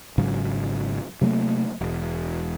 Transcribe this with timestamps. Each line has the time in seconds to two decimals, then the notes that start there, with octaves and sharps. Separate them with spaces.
0.18 G#1 G#2 C#3 F#3
1.21 C3 F#3 A3 A#3
1.81 E1